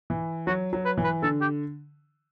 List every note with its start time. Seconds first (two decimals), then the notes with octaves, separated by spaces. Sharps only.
0.10 E3
0.47 F#3 F#4
0.73 F#3
0.85 B4
0.98 E3
1.04 B4
1.23 D3 A4
1.41 G4